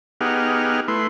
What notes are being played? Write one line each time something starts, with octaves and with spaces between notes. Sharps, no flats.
B3 D#4 G4 G#4 F#5 F6
A3 E4 B4 C6